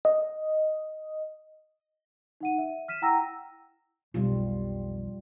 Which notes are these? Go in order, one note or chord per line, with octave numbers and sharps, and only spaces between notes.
D#5
D#4 F#5 D#7
E5
F6 B6 D#7 E7
E4 F#5 G5 A#5 E6 A#6
B1 F2 G3 F4